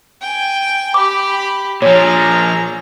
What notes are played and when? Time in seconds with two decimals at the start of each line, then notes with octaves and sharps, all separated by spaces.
0.21 G5 G#5
0.94 G4 B5 D6
1.82 A#2 F3 G#4 C#5 A#5